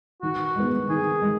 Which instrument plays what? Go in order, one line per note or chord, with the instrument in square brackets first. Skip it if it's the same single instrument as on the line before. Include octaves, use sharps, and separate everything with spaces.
[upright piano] D#3 [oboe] F#4
[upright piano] G#3 B3
[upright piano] D#3 [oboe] G#4
[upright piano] G#3